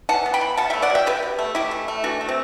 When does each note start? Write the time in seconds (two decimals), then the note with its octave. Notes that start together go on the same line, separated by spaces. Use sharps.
0.09 E3 F#5 A5
0.26 B3
0.34 G5 B5
0.41 E3
0.57 B2 F#5 A5
0.70 E5 G5
0.74 A3
0.82 D5 F#5
0.90 F#3
0.95 E5 G5
1.06 B2 G4 B4
1.23 B2
1.38 A3
1.55 A3 E4 G4
1.71 E3
1.88 A3
2.04 E3 D4 F#4
2.21 A3
2.29 C4